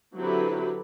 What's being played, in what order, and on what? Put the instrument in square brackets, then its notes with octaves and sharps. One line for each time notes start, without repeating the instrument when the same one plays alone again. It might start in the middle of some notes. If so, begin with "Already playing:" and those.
[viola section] D3 F#3 C4 E4 G4 B4